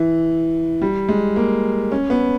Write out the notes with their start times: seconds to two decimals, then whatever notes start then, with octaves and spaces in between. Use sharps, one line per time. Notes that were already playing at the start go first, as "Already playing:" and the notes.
Already playing: E3
0.82 G3
1.08 G#3
1.36 A#3
1.92 C#4
2.10 B3